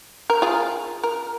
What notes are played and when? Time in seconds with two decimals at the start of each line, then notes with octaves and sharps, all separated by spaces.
0.30 A#4
0.42 F4 G#4
1.03 A#4